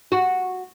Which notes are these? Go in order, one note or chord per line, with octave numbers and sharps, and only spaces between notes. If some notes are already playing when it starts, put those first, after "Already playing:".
F#4